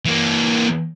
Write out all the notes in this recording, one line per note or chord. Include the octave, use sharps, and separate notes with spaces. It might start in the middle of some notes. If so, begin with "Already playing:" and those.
E3 A#3